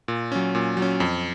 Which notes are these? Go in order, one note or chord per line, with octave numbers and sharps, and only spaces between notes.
A#2
F#3 C#4
A#2
F#3
C#4
F2